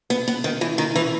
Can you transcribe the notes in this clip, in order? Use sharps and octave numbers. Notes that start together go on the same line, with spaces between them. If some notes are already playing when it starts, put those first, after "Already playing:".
B3
B3
D#3
E3
D#3
E3